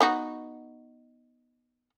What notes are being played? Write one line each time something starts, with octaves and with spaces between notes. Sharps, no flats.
B3 D#4 F#4